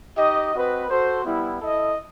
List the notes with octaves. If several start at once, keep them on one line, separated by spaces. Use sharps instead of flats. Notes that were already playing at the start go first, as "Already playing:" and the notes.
D#4 G4 D#5
C4 F#4 B4 D#5
F#4 A4 C5
G3 B3 E4
E4 A4 D#5